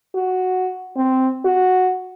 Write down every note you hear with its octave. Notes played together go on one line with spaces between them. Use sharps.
F#4
C4
F#4